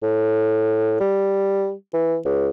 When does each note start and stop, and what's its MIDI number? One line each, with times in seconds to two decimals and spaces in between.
0.03 0.98 45
1.00 1.72 55
1.93 2.17 52
2.25 2.50 37